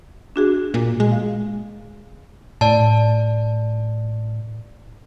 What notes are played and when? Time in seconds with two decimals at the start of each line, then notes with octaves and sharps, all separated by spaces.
0.36 D4 F#4 G#4
0.74 A#2
1.00 G#3
1.12 F5
2.61 A2 D5 A5